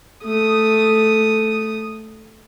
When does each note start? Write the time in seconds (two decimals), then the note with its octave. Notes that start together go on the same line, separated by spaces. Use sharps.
0.24 A3 D#6